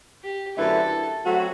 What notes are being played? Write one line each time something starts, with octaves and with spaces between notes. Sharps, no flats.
G4
F#2 D3 A3 E4 A4 B4
F#3 A3 C4 F#4